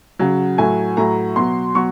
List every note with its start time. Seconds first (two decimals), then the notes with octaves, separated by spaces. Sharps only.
0.19 C#3 F#3
0.58 A2 F#3 G#5
0.97 A2 F#3 A#5
1.36 B2 F#3 C6
1.75 B2 F#3 C#6